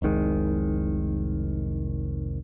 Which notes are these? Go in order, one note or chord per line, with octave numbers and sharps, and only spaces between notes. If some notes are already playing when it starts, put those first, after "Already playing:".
F1 C2 D#3 G#3